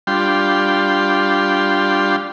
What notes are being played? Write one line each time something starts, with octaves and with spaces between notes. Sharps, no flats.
G3 D4 F4 G5 C6